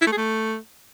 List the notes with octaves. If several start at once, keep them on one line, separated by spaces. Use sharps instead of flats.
E4
A3
G#4
A3